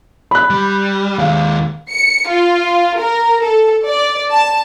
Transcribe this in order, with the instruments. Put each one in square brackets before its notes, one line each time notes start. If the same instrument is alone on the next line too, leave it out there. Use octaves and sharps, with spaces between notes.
[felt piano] B5 F#6
[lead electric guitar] G3
[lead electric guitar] D#2 G#3 [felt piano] F5
[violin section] C#7
F4
A#4
A4
D5
A5